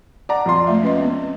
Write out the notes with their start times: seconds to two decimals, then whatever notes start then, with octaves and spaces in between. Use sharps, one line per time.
0.29 D5 F#5 A#5
0.46 F2 F4 C6
0.67 G#3 A3 E5
0.83 C#4 B4 D#5
0.98 B3 C4